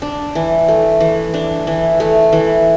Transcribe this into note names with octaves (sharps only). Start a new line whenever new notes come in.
D4
E3
A3
E3
D4
E3
A3
E3